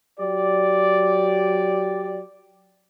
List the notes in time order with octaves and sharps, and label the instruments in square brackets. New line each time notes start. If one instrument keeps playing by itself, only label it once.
[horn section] F#3 G4 D5